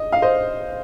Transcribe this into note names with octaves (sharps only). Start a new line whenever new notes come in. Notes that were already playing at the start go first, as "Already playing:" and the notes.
Already playing: D#5
F5
C5 D#5